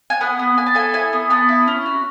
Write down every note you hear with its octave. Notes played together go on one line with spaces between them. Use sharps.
G#5
B3 F#5
B3
B3 G#5
A5
A4 G#5
E4 G#5
B3
B3 A5
E4
C#4
F#4